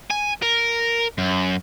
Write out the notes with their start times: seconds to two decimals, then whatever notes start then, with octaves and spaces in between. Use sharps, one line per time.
0.11 G#5
0.42 A#4
1.18 F#2